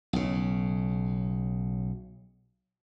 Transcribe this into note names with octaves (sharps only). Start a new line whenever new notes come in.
B1 C#3